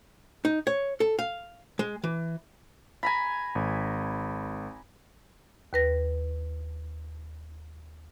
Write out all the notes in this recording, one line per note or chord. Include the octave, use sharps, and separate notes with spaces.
D#4
C#5
A4
F5
G#3
E3
G#5 A#5 B5
G#1
D#2 B4 A#6